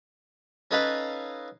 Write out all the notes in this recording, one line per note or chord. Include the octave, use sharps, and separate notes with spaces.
C#4 D#4 A4 B4 F5 B5